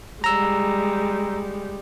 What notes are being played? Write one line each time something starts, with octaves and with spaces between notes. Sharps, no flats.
G3 G#3 A#5 E6